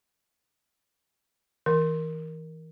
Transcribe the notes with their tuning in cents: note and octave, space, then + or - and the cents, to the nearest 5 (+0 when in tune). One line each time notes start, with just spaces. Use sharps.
E3 -35 A#4 +0